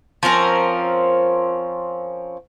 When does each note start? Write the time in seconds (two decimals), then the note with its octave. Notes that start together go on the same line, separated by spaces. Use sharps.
0.23 F3 C4 C#4 A#4